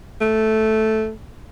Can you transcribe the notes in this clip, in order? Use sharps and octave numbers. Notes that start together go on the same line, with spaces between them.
A3